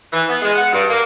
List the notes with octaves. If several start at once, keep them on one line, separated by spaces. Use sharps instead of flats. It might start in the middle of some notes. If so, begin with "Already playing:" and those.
E3
B3
G#3
F#5
G2
A#3